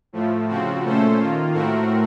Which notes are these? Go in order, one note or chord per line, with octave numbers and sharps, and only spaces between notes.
A2 F3 A3
C#3 F3 C4 F#4
A#2 A3 C#4 A4 C5
D#3 A#3 F4
A2 A3 C4 F#4 A#4